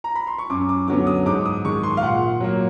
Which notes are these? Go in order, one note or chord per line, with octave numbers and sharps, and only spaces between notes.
A#5
B5
C6
C#6
F#2 D6
D6
D3 F#3 B3 D6
D#6
G#2 D6
D#6
D#3 G#3 C#6
C6
F5
A#2 F#5
F#3 A#3